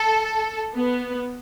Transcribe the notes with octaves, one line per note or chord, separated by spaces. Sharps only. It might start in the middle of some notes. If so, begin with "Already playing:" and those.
Already playing: A4
B3